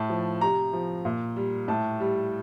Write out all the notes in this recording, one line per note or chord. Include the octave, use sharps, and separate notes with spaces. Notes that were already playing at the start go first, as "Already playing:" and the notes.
Already playing: A2 A5
F3
C3 A#5
F3
A#2
G3
A2 A5
G3